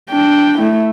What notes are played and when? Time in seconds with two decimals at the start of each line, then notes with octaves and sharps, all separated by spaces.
0.10 D4 G5
0.59 A3 E4